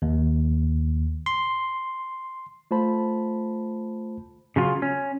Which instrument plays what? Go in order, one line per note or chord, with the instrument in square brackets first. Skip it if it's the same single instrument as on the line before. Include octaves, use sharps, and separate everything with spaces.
[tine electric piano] D#2
C6
[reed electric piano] A3 F4 C5 A5 B5
[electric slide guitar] C#3 F#3 F4
C#4